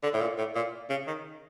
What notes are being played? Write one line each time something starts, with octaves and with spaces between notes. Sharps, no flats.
D3
A2
A#2
A2
A#2
C#3
D#3